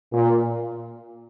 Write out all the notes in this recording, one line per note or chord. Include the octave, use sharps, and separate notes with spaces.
A#2